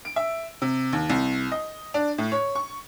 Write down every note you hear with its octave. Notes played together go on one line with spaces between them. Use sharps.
D7
E5
C3
D#2
C2
D#5
D4
A2
C#5
C#6